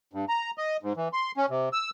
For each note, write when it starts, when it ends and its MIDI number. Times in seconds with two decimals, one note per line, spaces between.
0.13 0.25 43
0.29 0.51 82
0.58 0.77 75
0.83 0.93 44
0.97 1.09 52
1.13 1.32 84
1.37 1.46 61
1.50 1.69 48
1.73 1.90 88